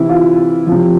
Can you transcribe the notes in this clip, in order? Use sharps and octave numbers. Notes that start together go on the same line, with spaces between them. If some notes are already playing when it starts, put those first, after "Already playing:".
Already playing: C3 E3 E4
F4
C3 F3